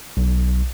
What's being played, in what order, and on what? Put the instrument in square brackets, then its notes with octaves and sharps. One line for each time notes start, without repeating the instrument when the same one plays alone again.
[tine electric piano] B1